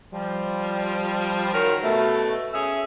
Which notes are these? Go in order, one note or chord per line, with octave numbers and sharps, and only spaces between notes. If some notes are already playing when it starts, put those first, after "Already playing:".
F3 G3
D#3 F#3 A#4
B2 A3
C#4 G#4 E5